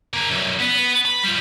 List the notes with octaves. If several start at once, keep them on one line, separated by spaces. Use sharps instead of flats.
C#3 A#3
B1 F#2
B3
B5
G3 F4